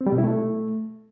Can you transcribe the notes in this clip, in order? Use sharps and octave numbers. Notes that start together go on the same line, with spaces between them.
C4
G3
B2
E4
A3